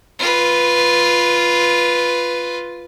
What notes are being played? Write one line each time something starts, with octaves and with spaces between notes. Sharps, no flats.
F4 B4